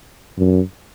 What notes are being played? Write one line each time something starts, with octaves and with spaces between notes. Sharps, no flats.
F#2